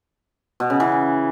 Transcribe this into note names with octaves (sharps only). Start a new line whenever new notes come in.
B2
C#3
E3